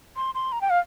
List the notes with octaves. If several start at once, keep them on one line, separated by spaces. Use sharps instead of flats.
C6
C6
A#5
G5
F5